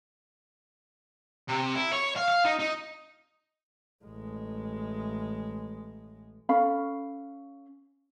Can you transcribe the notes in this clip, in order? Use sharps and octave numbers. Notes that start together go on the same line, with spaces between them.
C3
E4
C#5
F5
F5
D#4
D#4
A1 G#3
C#4 A4 F5 B5